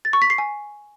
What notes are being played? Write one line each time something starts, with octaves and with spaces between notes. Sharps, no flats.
A6
C#6
B6
C7
G#5